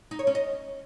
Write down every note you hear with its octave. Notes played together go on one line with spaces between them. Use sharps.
D#4
C#5
C#4
D#5